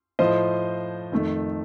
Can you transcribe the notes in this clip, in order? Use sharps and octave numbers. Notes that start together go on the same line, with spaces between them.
A2 F3 A3 C5 D#5
F2 D#3 A3